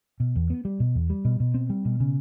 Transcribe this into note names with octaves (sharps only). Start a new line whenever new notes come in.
B2
E2
B3
G3
B2
E2
G3
B2
B2
C4
G3
B2
C#3